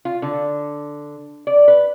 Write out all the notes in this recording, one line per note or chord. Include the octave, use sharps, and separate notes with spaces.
F4
D3
D5
B4